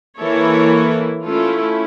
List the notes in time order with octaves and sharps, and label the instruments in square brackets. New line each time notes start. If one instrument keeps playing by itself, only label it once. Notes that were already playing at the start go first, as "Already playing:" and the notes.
[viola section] E3 A#3 E4 A4 C#5
A3 C#4 E4 F4 A4